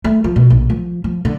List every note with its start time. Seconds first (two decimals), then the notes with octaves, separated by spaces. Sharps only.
0.04 A3
0.24 F3
0.36 B2
0.50 A#1
0.70 F3
1.04 F3
1.25 D3